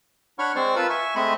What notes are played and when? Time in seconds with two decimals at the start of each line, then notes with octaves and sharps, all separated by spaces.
0.39 D4 C#5 F#5 B5 C#6 F6
0.56 G#3 C4 C5 D5 C#6
0.76 F4 A#4 B4 A5 B5 E6
0.90 E5 G#5 C#6
1.16 G#3 A3 C4 D#5 E5 B5